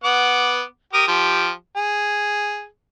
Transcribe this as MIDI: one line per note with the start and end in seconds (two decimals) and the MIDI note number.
0.04 0.62 59
0.04 0.62 78
0.04 0.62 86
0.93 1.05 67
0.93 1.05 70
0.93 1.05 87
1.08 1.50 53
1.08 1.50 67
1.76 2.66 68